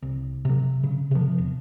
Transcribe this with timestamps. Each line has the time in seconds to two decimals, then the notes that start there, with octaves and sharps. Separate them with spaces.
0.02 C2
0.45 C3 F#3
0.83 C#3
1.11 C3 F3
1.38 E1